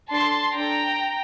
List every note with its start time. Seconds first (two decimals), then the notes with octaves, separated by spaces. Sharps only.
0.11 D4 A4 A5 C6
0.55 D4 A4 G5 A#5